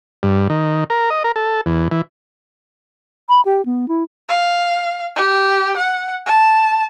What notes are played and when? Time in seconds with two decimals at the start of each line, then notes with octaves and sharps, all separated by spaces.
0.23 G2
0.50 D#3
0.90 A#4
1.10 D#5
1.24 A#4
1.36 A4
1.66 E2
1.91 E3
3.29 B5
3.45 G4
3.65 B3
3.88 E4
4.29 F5
5.16 G4
5.77 F#5
6.26 A5